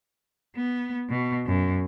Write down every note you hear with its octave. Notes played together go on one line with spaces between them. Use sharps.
B3
B2
F#2